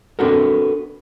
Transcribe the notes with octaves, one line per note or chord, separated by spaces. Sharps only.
B3 C4 D4 F#4 A4 A#4